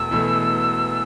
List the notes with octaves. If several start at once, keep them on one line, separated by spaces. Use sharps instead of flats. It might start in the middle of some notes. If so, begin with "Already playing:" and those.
Already playing: E1 E2 B2 A3 E4 E6
E1 E2 B2 A3 E4